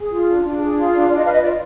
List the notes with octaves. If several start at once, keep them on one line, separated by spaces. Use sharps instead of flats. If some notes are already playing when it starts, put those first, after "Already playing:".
Already playing: G#4
F4
D4
D4
G#4
F4
D4
D4 D5
D#5
B4 F5
D#5
F4 D5